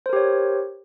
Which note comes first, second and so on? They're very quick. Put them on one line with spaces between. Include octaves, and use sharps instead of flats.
C5 A#4 G4 C#5